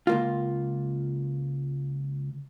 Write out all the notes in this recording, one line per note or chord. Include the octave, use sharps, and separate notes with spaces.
C#2 A#3 F4